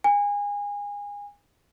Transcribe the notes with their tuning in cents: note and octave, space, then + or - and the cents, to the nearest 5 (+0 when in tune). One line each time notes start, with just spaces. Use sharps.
G#5 -30